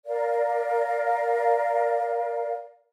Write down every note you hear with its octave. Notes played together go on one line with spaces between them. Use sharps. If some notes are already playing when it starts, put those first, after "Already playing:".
A#4 D5 F5